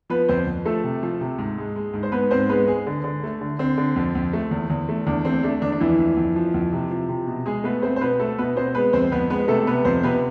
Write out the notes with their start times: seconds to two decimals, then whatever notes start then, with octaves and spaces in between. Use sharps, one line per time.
0.10 F3 B3 B4
0.29 F2 C4 C5
0.47 F2
0.65 F3 A3 A4
0.84 C3
1.03 F3
1.21 C3
1.39 G#2
1.58 G#3
1.76 G#3
1.94 G#2
2.03 C5
2.12 G#2 B3 B4
2.31 G#2 C4 C5
2.49 G#3 B3 B4
2.67 G#3 G#4
2.86 D3
3.04 D3
3.23 A3
3.41 D3
3.59 D3 C4
3.78 D3
3.96 F2
4.15 F2
4.33 A3
4.51 E2
4.70 E2
4.89 A3
5.07 E2 D4
5.25 A3 C4
5.43 A3 D4
5.62 E2 D4
5.72 D4
5.80 F2 E3 E4
5.99 F2
6.17 F2
6.36 F3
6.54 F2
6.73 C3
6.91 F3
7.09 C3
7.27 B2
7.46 B2 G#3 G#4
7.64 A3 B3 B4
7.82 A3 C4 C5
7.96 C5
8.01 B2 B3 B4
8.20 A3 A4
8.38 B2 B3 B4
8.56 B2 C4 C5
8.75 G#3 B3 B4
8.93 F2 C4 C5
9.12 F2 B3 B4
9.30 G#3 B3 B4
9.48 C3 A3 A4
9.67 C3 B3 B4
9.85 F2 C4 C5
10.03 C3 B3 B4